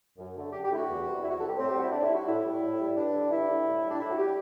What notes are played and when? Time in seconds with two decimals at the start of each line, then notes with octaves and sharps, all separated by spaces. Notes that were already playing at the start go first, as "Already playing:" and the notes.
0.18 F#2
0.35 D3 A3
0.52 F#2 G4
0.64 G4
0.70 D3 A3 E4
0.76 F#4
0.87 E2
1.05 C3 G3
1.22 E2 E4
1.30 F#4
1.40 C3 G3 A4
1.48 G4
1.57 A2 C4
1.68 G4
1.75 G3 F#4
1.83 E4
1.91 A2 D4
2.03 E4
2.09 G3
2.15 F#4
2.26 A2 E4
2.43 G3
2.61 A2
2.79 G3
2.96 G2 D4
3.14 D3 G3
3.31 G2 E4
3.48 D3 G3
3.66 A2
3.83 G3
3.90 D4
4.00 A2 E4
4.10 F#4
4.18 G3 G4